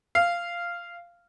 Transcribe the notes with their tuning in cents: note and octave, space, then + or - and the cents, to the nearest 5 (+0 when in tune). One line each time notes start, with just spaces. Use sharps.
F5 -10